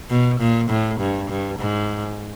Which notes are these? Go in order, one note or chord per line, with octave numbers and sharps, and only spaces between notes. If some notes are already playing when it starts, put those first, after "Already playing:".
B2
A#2
A2
G2
G2
G#2